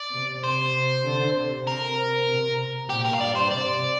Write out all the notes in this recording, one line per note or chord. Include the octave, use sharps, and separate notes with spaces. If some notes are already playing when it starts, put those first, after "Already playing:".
Already playing: D5
C3
C3 C5
D3
C3
A#4
C3
A#2 G4
A#4
F5
G2 D5
C5
C3 D5